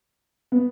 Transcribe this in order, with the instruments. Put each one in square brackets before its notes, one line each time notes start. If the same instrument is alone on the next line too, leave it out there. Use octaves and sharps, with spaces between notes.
[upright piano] B3